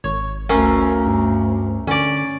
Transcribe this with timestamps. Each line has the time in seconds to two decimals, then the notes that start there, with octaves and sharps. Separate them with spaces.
0.04 G#1 C#5
0.49 D2 A3 C#4 A#4 F5
1.07 G2
1.87 D3 C#4 D5